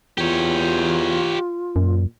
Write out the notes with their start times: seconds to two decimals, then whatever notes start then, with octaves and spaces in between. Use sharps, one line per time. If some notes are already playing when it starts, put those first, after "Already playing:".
0.18 E2 F4 G4 C#5
1.76 F#2 A#2